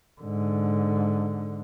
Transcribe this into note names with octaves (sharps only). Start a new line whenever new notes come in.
G#2 D3